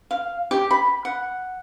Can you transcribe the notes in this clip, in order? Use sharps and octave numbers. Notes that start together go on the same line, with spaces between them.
F5
G4
B5
F#5